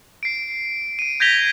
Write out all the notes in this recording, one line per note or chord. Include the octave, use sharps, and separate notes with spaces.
C7 D7
D7 D#7
G6 G#6 A#6 B6 F7 G7